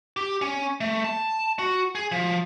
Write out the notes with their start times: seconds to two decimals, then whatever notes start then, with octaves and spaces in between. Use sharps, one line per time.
0.17 G4
0.42 C#4
0.81 A3
1.05 A5
1.59 F#4
1.95 G#4
2.12 F3